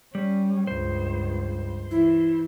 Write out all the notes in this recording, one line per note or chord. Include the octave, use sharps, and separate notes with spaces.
G3 C#4
C#2 G2 C5
E3 E4